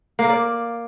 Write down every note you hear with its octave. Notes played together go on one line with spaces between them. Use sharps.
A#3
A#4
D5